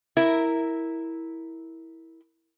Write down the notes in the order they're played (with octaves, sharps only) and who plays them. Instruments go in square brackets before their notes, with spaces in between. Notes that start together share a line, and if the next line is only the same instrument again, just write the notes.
[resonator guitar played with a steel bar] E4 A#4